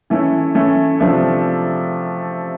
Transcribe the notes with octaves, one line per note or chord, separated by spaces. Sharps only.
E3 A3 C#4 E4
E3 A3 C#4 E4
C3 F3 A3 D4